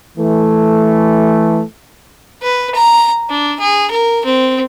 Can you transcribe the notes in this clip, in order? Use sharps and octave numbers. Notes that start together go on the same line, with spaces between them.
E3 A3
B4
A#5
D4
G#4
A#4
C4